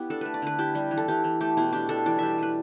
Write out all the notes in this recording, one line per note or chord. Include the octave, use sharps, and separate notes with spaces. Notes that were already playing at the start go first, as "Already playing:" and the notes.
Already playing: B3 E4 G4
D4 A4
A3 B4
D5
D3 B4
E4 G4
G3
E3
A4
E3 G4
E3
A3 G4
B2 E4
D4 G4
D4 A4
E3 D5
G3 E5
G3 B4